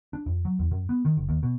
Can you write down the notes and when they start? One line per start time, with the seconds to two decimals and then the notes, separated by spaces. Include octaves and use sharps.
0.13 D4
0.26 F2
0.45 F#3
0.59 E2
0.71 F#2
0.89 B3
1.05 D#3
1.17 F#1
1.29 D#2
1.43 B2